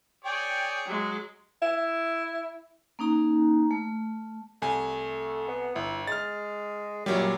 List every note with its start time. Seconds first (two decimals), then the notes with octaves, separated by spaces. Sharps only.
0.24 G#4 C#5 D5 G5
0.86 F#3 G#3
1.62 E4
2.99 A#3 C#4 D#4 A#5
3.71 A3
4.62 C2 A3 G#5
5.48 B3
5.76 G1 E4
6.07 G#3 F6 A6
7.06 F#2 A#2 F#3 G3